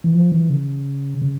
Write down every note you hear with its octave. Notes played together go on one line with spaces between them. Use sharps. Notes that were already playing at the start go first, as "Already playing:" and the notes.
E3
F3
E3
C#3
C#3